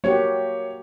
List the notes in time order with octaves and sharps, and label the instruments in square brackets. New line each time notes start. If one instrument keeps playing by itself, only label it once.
[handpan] A#3 F#4 G4 [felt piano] C#5